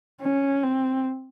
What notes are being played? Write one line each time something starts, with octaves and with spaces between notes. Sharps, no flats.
C#4
C4